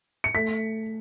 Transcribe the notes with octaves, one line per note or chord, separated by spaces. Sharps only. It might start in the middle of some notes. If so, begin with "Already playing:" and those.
C#7
A3 B6